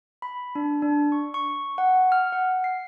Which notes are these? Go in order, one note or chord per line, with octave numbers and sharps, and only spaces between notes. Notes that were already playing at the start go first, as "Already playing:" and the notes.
B5
D4
D4
C#6
C#6
F#5
F6
F#5
C7